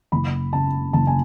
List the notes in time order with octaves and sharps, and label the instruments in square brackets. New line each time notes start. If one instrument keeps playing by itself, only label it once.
[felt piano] F#1 B5
C#3 A5
F#1 A5
G#5